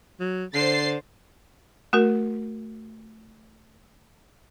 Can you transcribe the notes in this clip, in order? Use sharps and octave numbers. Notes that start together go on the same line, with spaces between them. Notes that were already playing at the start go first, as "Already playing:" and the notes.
F#3
D3 C5 A6 C7
A3 F#4 A#4